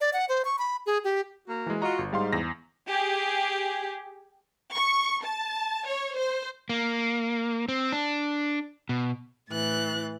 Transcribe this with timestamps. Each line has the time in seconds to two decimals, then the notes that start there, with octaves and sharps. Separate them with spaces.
0.01 D5
0.13 F#5
0.29 C5
0.45 C#6
0.59 B5
0.86 G#4
1.04 G4
1.47 A#3 F#4 A#4
1.66 E3 G#3
1.82 F4 F#4 D#5 A#5
1.98 G1
2.13 G#2 G3 F5 C6
2.33 E2 A#6
2.88 G4 G#4
4.74 C#6
5.23 A5
5.87 C#5
6.17 C5
6.69 A#3
7.69 C4
7.93 D4
8.89 B2
9.51 A2 E3 F#6 A6